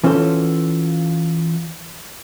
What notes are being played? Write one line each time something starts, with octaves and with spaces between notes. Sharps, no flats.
E3 C#4 F4 F#4 A4 C5